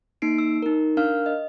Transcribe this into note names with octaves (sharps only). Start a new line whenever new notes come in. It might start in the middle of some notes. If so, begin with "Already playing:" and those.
A#3 D#4 C7 D7
E6
D#4 A#4
D4 A#4 F5 F6
D#5